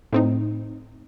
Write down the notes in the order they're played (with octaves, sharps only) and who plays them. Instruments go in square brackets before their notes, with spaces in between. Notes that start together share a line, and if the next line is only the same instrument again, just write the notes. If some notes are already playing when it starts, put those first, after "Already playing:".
[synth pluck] A2 C4 D#4